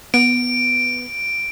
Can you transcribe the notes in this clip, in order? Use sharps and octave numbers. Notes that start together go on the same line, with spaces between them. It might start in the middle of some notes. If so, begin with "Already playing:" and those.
B3 D7